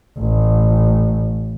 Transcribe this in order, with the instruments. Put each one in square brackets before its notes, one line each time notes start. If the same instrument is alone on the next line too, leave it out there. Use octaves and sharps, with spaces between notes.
[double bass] A1